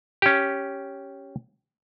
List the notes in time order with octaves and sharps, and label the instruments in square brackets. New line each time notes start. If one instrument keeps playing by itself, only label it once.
[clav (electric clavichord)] C#4 G4